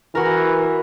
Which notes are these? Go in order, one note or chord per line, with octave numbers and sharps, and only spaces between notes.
E3 F#4 A#4